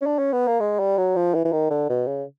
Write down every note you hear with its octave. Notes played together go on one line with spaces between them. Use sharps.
C#4
D4
C#4
B3
A#3
G#3
G3
F#3
F3
E3
E3
D#3
D3
B2
C#3